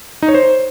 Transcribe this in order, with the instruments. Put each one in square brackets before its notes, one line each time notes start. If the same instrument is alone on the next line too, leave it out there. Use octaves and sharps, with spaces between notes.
[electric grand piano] D#4
C#5
C5